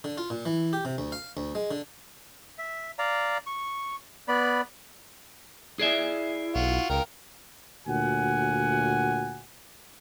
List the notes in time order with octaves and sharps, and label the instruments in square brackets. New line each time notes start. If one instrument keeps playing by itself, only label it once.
[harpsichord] D3
F4
A#2
E3
G4
C3
D2
F5
D2
G#3
D3
[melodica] E5
D5 F5 A#5
C#6
B3 D5 B5
[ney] E4 [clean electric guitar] G#4 D5 E5
[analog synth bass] B1 [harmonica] F4 F#4
[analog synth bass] C#2 [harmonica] A#4 G5 [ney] F5
[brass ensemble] D2 A#2 F#4 F#5 G#5